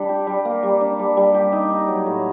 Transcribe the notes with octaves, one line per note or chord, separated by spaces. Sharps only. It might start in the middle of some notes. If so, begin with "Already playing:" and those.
Already playing: G3 D4
G4
G3
A#3
G3
D4
G3
G3
G4
D#4
D#4
F#3
A2